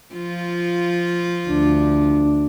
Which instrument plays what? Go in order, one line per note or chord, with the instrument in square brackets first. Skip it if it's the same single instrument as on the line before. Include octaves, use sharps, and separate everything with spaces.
[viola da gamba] F3 F4
[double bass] D2 D4